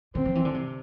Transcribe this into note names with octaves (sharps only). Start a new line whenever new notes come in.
D3 C4
F3
E3
D3
C3